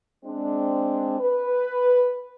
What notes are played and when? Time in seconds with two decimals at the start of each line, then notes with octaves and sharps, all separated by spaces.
0.24 G#3 C4 D4
1.20 B4